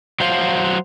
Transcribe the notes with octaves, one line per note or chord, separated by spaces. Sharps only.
F#3 C5 F5